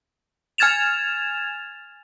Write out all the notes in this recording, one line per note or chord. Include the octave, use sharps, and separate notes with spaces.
G#5 F6 G#6 A6 E7 F7